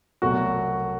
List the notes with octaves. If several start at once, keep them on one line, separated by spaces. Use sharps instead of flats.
C2 B2 F#3 A3 F#4